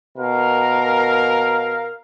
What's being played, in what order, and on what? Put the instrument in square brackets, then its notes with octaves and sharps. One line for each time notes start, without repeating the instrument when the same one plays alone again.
[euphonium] B2 [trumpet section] A#4 F5